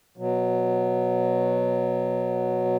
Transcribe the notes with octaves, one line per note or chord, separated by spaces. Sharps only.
B2 F#3